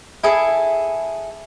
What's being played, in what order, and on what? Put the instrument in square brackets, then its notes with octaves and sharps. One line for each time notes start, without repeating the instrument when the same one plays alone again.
[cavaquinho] E4 G#4 A4